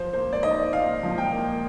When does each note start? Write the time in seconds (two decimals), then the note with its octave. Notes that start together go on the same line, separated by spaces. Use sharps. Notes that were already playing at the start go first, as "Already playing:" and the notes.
Already playing: F3 C5
0.13 A#3 C5
0.33 D5
0.43 D#4 D#5
0.73 A#2 F5
1.03 F3
1.18 G5
1.33 A#3